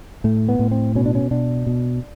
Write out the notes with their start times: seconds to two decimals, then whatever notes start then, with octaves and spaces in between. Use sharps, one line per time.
0.24 A2 A3
0.49 B3
0.59 A2
0.71 C4
0.95 B2 C#4
1.06 D4
1.15 C#4
1.31 B2 D4
1.67 B2